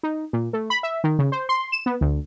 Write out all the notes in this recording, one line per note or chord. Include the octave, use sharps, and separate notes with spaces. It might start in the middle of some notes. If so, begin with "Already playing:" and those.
D#4
A#2
A3
B5
E5
D#3
C#3
C5
C6
E7
B3
D2